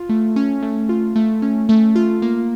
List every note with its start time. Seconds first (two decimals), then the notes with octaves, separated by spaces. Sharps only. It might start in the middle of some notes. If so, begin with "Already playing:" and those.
Already playing: F4
0.09 A3
0.36 C#4
0.62 A3
0.89 F4
1.16 A3
1.42 C#4
1.69 A3
1.96 F4
2.22 A#3